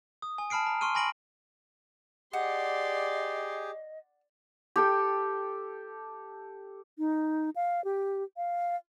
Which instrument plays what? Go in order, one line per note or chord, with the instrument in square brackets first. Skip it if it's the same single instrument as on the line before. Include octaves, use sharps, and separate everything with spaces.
[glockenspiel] D#6
G#5
A5 B5 F6 C7 D7
A#5
C6 C#6 F6 D#7
G#5 B5 A#6 D7 F#7
[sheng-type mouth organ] G4 G#4 [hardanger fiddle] D5 C6 [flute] D#5 [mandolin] F#5
[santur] G4 A4 G5
[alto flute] D#4
F5
G4
F5